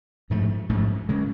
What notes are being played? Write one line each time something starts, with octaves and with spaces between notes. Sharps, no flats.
A1 G#2 F3 A3
A1 G#2 F3 A3
C#3 G#3